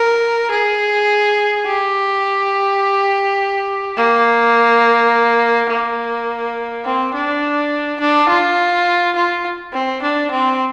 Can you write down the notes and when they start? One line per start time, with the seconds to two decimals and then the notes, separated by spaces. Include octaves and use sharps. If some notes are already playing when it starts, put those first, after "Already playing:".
Already playing: A#4
0.51 G#4
1.66 G4
3.97 A#3
5.70 A#3
6.85 C4
7.14 D4
8.00 D4
8.29 F4
9.16 F4
9.73 C4
10.02 D4
10.31 C4